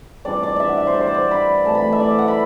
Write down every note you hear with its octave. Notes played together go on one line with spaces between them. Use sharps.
C3 E3 G3 D4 D5
D5
D5 E5
F#5
E5
C5
D5
C5
D5
C5
B5
C3 E3 A3 A5
B5
E5
D5
F#5
B5